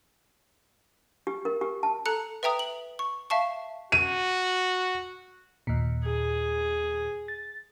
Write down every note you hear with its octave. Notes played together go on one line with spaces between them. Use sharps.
G4
A#4
G4
A5
A4 A#5 F#6 C#7
B4 E5 G5 A#5 D#6
F#7
C#6
E5 F5 A5 C#6
F#4 D#7
D#2 A#2
G#4
A6